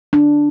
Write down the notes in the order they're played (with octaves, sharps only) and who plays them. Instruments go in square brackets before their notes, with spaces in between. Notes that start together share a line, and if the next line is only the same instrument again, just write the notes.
[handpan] D4